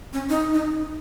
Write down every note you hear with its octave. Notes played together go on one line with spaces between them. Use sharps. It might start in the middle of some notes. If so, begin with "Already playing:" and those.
C#4
D#4
D#4